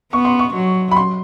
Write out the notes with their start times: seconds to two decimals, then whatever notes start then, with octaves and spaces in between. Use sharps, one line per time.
0.12 B3 C#6
0.25 C6
0.39 C#6
0.55 F#3
0.91 B5
0.96 C6